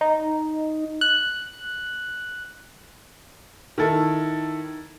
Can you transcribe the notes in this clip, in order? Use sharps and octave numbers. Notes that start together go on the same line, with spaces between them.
D#4
F#6
D#3 E4 A4